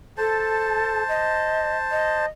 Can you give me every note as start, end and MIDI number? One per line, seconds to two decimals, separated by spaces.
0.18 1.03 69
0.18 2.26 72
0.18 2.26 81
1.08 1.76 75
1.91 2.27 75